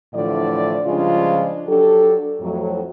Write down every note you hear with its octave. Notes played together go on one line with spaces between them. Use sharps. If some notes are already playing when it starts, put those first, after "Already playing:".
A2 D3 E3 F3 D5
C#3 F3 G3 G#3 D4 F4
F#3 D4 G4 A4
F2 A2 F#3